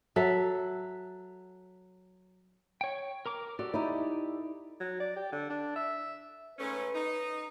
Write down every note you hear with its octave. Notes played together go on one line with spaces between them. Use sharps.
F#3 A4 E5
C#5 G5
A#4 A#5 D6
F#4 G4 A4 D5
D#4 E4
F#3
D5
G4
D3
D4
E5
G#2 A3 C#4 B4
D#4